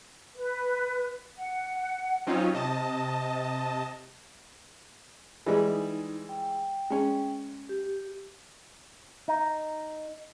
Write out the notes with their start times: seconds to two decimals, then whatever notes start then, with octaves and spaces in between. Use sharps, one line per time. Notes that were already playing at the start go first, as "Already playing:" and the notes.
0.35 B4
1.37 F#5
2.27 F#3 C4 C#4 D#4 F4
2.54 C3 D#5 A5
5.46 E3 G3 G#3
5.72 D#4
6.29 G5
6.90 G#3 C#4
7.69 G4
9.28 D#4